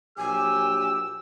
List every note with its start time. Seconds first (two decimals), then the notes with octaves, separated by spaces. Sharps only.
0.18 A#1 F#3 G4 G#5 E6